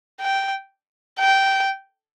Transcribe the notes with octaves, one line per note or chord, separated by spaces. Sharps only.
G5
G5